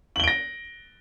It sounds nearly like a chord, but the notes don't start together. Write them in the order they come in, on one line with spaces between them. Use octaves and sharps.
F#7 G7 D7 A#6